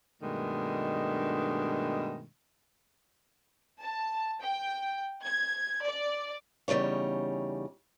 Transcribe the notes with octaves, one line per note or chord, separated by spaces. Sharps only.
G2 B2 D#3 G#3 A3 D4
A5
G5
G#6
D5
E2 C#3 G3 D#4 C#5